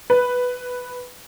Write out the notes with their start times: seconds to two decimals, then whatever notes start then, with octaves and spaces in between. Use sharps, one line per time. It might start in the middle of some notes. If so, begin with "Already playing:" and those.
0.10 B4